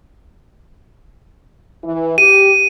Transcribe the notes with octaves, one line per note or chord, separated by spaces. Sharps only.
E3
G4 D#7